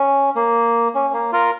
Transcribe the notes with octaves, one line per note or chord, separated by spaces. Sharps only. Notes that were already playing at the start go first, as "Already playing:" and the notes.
Already playing: C#4
A#3
C#4
A#3
F4 A#4